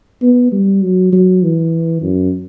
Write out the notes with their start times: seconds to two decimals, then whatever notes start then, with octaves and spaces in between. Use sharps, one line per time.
0.22 B3
0.52 G3
0.82 F#3
1.12 F#3
1.43 E3
2.02 F#2